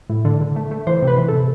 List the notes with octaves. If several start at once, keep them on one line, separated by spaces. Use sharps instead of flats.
A2
D3
D3
A3
A3
E3 C5
C3
B4
E3
C3 A4